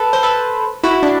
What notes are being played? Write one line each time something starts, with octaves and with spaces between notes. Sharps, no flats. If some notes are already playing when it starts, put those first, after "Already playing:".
Already playing: A4 B4
C5
A4 B4
E4 F#4
D4